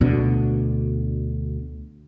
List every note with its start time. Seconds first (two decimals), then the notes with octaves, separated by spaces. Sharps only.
0.01 D2 B2 D3